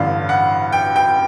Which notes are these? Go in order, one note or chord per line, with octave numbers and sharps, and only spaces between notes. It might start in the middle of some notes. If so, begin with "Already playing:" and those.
Already playing: A1 G2 D3 F5
F#5
G5
G5